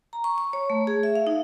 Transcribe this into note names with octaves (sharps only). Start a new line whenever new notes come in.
A#5
C#6
C#6
C#5
A3
G#4
E5
F5
D#4